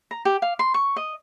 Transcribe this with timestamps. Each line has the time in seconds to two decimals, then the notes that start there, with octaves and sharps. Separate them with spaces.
0.11 A#5
0.25 G4
0.42 F5
0.59 C6
0.74 C#6
0.96 D#5